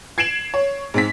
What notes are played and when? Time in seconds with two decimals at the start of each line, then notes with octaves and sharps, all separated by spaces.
0.18 G#6 C7 D7 E7 F#7
0.54 C#5
0.94 G#2 C4 B6